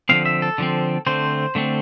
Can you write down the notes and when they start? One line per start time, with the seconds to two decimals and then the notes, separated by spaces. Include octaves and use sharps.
0.09 D3 F3 C4 F5
0.26 E5
0.42 A4
0.58 D3 F3 C4
1.06 D3 A3 C4 C5
1.55 D3 A3 C4